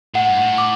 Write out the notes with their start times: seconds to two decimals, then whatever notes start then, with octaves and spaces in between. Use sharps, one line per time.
0.14 A2 F#5
0.27 G2
0.38 A2
0.58 D6